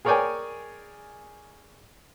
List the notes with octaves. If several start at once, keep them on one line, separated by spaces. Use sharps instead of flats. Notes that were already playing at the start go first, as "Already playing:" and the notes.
G#4 A#4 C#5 D5 G5 G#5